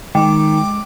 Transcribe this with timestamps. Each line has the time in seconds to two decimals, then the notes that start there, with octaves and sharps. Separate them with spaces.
0.15 D#3 G#3 G5 D6